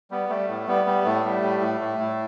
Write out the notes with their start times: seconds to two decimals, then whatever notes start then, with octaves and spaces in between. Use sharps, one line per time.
0.11 G3 B3
0.29 G3 A3
0.48 A2
0.68 G3 B3
0.87 G3
1.04 A2 A3
1.24 G3
1.43 A2
1.61 A2
1.81 A2
1.99 A2